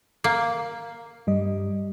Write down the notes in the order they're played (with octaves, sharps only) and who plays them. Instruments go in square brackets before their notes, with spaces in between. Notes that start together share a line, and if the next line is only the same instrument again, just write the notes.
[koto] A#3
[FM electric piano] G2 G3 D#5